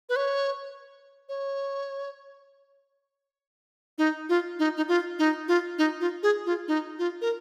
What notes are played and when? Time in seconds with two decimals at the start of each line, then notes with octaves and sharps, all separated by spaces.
0.09 B4
0.16 C#5
1.29 C#5
3.98 D#4
4.29 F4
4.59 D#4
4.77 D#4
4.88 F4
5.19 D#4
5.48 F4
5.78 D#4
6.00 F4
6.23 G#4
6.46 F4
6.68 D#4
6.99 F4
7.21 A#4